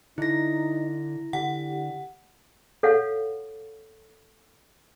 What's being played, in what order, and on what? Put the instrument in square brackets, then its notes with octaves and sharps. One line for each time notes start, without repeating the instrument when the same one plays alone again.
[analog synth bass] D3 [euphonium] D#4 [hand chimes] E4 A#6
[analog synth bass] D3 [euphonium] G4 [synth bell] F#5
[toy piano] A4 C#5 F5 F#5